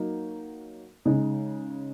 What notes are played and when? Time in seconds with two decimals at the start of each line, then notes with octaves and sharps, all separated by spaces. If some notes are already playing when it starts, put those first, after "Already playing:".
Already playing: F#3 A#3 D#4
1.05 C#3 G#3 D#4